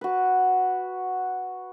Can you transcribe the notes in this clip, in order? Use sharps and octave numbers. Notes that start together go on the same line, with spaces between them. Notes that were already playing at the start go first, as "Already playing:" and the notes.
F#4 B4